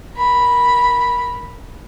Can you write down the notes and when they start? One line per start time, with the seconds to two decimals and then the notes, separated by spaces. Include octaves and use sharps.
0.16 A#4 B5